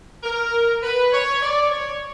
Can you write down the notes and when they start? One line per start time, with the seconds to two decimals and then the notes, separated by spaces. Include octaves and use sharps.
0.23 A#4
0.83 B4
1.12 C#5
1.42 D5
1.70 C#5